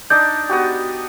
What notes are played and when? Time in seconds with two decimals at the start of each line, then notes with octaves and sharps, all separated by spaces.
0.10 D4 D#4 D5 G6
0.49 B3 F#4 G4